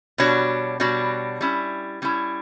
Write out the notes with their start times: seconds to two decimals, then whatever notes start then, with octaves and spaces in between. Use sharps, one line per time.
0.18 B2 G3 D4 F#4 C#5
0.80 B2 G3 D4 F#4 C#5
1.41 G3 C#4 E4
2.02 G3 C#4 E4